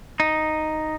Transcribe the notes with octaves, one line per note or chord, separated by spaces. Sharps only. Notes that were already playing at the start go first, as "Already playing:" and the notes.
D#4